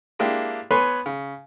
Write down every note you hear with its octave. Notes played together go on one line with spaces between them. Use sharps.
G#3 A#3 D4 E4 G4
B3 B4 C#5 G#5 B5 C6
C#3